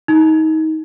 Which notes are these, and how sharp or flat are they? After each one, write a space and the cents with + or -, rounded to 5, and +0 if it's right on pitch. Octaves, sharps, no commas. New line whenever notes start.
D#4 +25